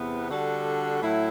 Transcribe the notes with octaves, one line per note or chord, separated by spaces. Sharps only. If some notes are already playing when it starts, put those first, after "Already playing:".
Already playing: E2 C3 B3
D3 G3 D4 F#4 A4
A2 F#3 A3 E4